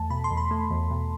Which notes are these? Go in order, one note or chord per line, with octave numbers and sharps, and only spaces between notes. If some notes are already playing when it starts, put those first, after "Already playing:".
Already playing: E2 A3 A5
B2 B5
C6
E2
B5
A3
E2
B2